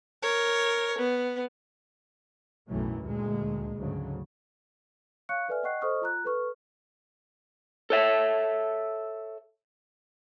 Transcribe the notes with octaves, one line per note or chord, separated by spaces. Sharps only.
A#4 C#5
B3
B1 F#2 A2 E3 F#3 A3
D2 A#2 G#3
D2 G#2 C#3 F#3
C#5 F5 C#6 F#6 C#7
A4 B4 D5 E5 G#5 F6
D#5 F#5 G5 C#6 F#6 C7
A4 C5 D#5 C#6 D#6 F6
F4 A#5 F#6
A4 B4 C#6 F6
A4 C#5 E5